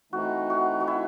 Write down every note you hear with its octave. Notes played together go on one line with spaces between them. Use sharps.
E3 A3 C4 D#4 F#4
F#4
F#4
E4